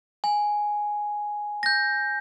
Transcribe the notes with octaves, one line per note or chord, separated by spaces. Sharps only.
G#5
G6 A#6